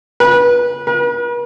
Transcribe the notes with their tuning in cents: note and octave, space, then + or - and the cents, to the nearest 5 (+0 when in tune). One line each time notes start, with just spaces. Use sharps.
B4 -25
B4 -45